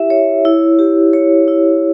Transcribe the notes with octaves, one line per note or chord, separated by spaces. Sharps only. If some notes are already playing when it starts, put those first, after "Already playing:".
Already playing: E4 G4 E5
C#5
E4
G4
C#5
E4